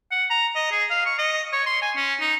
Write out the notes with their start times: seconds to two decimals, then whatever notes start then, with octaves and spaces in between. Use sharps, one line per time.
0.11 F#5
0.30 A#5
0.56 D#5
0.72 G#4
0.90 F5
1.06 C#6
1.19 D#5
1.53 C#5
1.66 C6
1.82 G#5
1.96 C#4
2.20 D#4